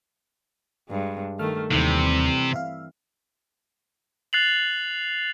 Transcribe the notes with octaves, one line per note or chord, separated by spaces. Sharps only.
G2 G#3
D#3 A3 F6
D#2 C3 D#3 E3 G3 C4
E5 F5
F#6 A6 C7 F7 F#7